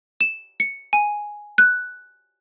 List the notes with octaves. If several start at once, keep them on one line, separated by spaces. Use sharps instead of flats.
E7
C#7
G#5
F#6